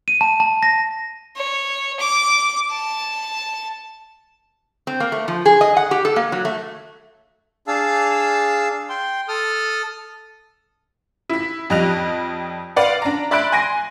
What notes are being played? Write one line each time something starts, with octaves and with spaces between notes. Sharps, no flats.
D#7
A5
A5
A#6
C#5
D6
A5
C4
A#3
A3
F3
G#4
D#5
F#5
G4
A4
A#3
F#3
A3
D4 G#4 F5 A5 E6
G5 C6
A4 D#6 F6
E4 B6
F2 G3 D#5 F#6 F7
B4 D5 F5 F#5
D4 A#5
D5 E5 B5 C6 F#6 D7
G#5 C6 A#6 D7